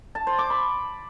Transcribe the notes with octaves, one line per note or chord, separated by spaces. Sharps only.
A5
C5
D6
B5